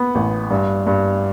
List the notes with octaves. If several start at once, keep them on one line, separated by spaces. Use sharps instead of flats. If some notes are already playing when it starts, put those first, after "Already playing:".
Already playing: B3
A1
G2
G2